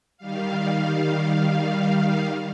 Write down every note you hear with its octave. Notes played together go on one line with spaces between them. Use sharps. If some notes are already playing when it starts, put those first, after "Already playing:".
D#3 G3 F5